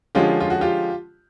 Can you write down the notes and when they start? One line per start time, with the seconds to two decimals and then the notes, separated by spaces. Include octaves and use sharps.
0.15 D3 F3 G#3 C#4 F4 G4
0.40 F4
0.50 F#4
0.61 F4 G4